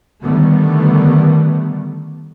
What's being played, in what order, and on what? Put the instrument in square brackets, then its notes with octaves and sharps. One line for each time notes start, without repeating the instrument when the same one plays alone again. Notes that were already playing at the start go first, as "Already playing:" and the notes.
[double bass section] D3 D#3 G3 A3 B3